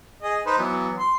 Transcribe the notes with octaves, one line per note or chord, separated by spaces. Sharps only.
G#4 D#5
D#4 B4 C5
E3 F#3 B3
C6